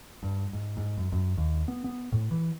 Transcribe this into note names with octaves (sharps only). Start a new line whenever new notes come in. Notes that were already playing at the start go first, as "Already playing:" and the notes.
G2
G#2
G#2
F#2
F#2
D#2
B3
B3
A2
E3